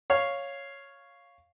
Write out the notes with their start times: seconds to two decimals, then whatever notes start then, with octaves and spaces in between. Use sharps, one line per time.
0.10 C#5 F5